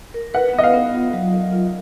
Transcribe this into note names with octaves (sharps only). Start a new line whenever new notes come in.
A#4
B4 F#5
B3 D#5
F5
B3
F4
F#3
A#4
F4